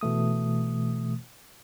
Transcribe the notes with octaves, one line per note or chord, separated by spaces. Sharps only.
B2 E3 A3 D#6